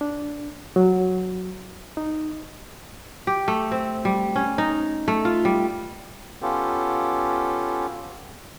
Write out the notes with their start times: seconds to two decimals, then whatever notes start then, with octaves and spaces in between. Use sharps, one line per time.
0.01 D4
0.76 F#3
1.97 D#4
3.27 G4
3.48 A3
3.72 C4
4.05 G3
4.36 C#4
4.58 D#4
5.08 A3
5.25 F4
5.45 G3
6.42 B3 C#4 F4 G4 A4